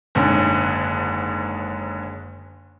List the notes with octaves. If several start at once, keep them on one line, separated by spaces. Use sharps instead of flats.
F#1 G#2 D3 C#4